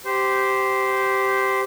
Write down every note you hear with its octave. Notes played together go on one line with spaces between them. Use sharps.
G4 C5